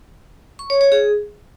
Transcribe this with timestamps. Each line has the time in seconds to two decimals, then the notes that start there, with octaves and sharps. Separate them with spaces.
0.59 C#6
0.70 C#5
0.81 C#5
0.92 G#4